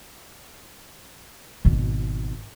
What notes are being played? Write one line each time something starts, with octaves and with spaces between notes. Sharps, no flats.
G#1 B2